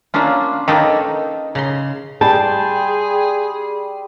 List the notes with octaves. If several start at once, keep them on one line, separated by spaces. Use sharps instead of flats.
A#3 C#4 D4 F4 E5
D#3 A#3 D#4 A4 B4
C#3 A#5 C6
G3 G#4 G5 A5 C6